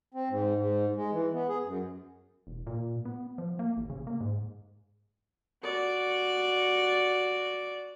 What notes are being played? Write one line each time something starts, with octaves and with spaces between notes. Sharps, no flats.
C4
G#2
G#2
G#3
E3
B3
G#4
F#2
E1
A#2
B3
F3
A#3
A1
C#3
A#3
G#2
F#4 D5